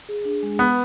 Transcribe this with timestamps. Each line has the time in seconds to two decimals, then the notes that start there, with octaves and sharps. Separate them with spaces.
0.09 G#4
0.25 D4
0.43 G#3
0.59 B3 B4